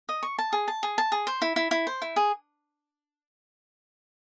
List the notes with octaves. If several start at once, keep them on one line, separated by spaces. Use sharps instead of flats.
D#5
C#6
A5
G#4
A5
G#4
A5
G#4
C5
E4
E4
E4
C5
E4
G#4